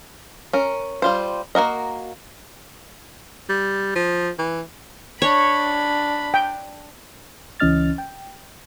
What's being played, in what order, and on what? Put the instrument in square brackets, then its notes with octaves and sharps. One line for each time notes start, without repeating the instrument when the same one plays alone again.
[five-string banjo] C#4 A#4
G3 F4 C5
A#3 F#4 A#4 D#5
[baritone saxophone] G3
F3
E3
[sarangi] D4 [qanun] C#5 [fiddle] B5
[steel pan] G5
[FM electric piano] C#2 E3 C#4 D#5 F6 A6
G5